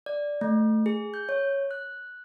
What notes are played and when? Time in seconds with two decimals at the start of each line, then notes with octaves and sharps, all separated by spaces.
0.06 D5
0.41 A3
0.86 G#4
1.14 G6
1.29 C#5
1.71 F#6